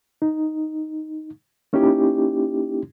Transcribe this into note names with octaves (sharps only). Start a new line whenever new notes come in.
D#4
A#3 C#4 D#4 E4 G4